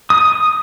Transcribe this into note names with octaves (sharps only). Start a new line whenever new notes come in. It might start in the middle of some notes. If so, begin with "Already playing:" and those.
D#6